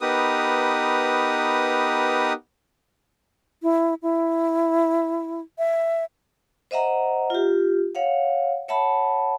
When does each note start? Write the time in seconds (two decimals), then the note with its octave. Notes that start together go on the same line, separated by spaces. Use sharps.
0.01 B3 D#4 G4 A#4 B4 D#6
3.63 E4
4.02 E4
5.58 E5
6.71 C5 D#5 E5 F#5 A#5
7.30 F4 G4
7.95 C#5 F5 F#5
8.68 C#5 E5 F#5 A5 B5